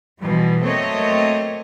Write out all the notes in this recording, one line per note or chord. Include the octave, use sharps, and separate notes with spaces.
B2 E3 F3 G3
F#3 A3 A#3 C4 C#5 D#5